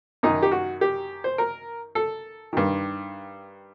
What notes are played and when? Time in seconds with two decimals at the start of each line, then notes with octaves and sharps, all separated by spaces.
0.23 F#2 D#3 D#4
0.42 G4
0.52 F#4
0.81 G4
1.24 C5
1.38 A#4
1.95 A4
2.53 G2 D#3